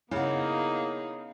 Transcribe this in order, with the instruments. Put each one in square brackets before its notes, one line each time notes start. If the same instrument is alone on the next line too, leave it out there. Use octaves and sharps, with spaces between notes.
[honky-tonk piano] C#3 [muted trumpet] A#3 [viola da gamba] B3 D#4 G#4 [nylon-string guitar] E4 F#5